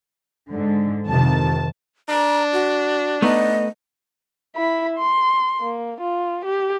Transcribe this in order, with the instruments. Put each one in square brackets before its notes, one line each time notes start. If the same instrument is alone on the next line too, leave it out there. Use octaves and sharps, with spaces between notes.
[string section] G#2 D3
[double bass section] F2 C3 D#3 [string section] A5
[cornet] D4 [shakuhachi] A#5
[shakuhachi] F#4
[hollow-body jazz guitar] A3 B3 D#4 [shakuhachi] D#5
[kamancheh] E4 B5
C6
A#3
F4
G4